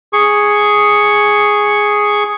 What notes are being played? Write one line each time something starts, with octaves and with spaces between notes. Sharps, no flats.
G#4 C#6